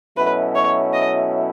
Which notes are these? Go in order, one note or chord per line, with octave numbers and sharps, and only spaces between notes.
B2 F#3 A3 C#4 E4 B4
C#5
D#5